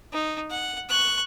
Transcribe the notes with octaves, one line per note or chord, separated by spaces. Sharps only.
D#4
F#5
C#6 F#6